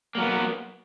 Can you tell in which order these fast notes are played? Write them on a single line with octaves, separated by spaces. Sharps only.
A#3 F#3 B3